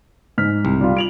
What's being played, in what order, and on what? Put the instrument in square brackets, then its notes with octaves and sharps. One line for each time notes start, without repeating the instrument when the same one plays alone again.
[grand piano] G#2 F6 B6
[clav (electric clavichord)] C2
[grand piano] G3 F4
D7 F7 F#7